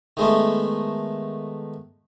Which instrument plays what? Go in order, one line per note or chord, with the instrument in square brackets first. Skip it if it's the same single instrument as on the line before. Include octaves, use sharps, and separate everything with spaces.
[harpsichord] D#3 G#3 A3 B3